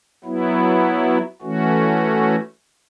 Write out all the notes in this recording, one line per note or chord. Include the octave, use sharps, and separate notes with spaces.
F#3 B3 E4
E3 A3 C#4 F#4